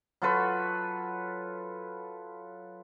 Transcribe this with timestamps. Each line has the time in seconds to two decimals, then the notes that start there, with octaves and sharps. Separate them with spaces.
0.22 F#3 F4 A4 B4